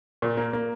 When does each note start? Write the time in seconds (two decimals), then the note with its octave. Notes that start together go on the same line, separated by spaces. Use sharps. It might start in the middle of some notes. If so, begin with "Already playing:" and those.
0.22 A#2
0.37 A#3
0.53 A#3